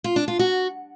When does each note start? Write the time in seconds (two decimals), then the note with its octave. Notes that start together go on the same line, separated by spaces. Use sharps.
0.04 F4
0.16 D4
0.28 F4
0.39 F#4